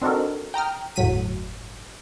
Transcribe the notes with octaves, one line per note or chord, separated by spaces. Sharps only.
C4 D4 D#4 F#4 A4 A#4
G5 A#5 D#6 F6
G1 E2 A2 F#3 B6 D#7